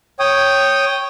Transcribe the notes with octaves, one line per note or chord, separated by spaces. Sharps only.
C#5 G5 D#6